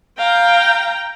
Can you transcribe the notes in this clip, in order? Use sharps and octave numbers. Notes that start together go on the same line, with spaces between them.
F5 G5 A#5